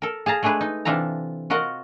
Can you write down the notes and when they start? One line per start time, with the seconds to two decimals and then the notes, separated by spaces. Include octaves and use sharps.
0.02 A4 A#4
0.26 G#4 F5 A5 A#5
0.43 G#3 A3 D4 G#4 B4
0.61 D#4
0.85 C3 E3 D4 F4 A4 A#5
1.50 F4 F#4 A#4 D#5 F#5